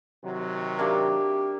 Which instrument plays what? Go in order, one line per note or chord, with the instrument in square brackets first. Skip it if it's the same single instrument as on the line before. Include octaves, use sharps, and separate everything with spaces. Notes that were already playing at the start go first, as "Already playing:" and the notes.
[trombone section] C3 D#3 F#3
[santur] A#3 D4 E5 [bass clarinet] G4